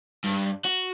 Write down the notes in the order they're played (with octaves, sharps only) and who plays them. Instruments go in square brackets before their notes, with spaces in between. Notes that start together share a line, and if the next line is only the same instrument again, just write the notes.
[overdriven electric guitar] G2
F#4